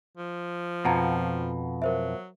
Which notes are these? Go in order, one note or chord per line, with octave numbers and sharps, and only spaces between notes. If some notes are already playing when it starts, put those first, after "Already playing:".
F3
F2 B2 F#5 A5 A#5
F#3 A#4 C5 E5